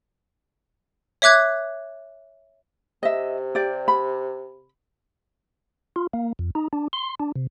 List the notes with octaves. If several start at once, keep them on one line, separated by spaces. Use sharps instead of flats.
C#5 E5 D6 F#6 G#6
C3 D#5 E5
G4 D5
B5
F4
A#3
F2
D#4
D4
C6
D4
C3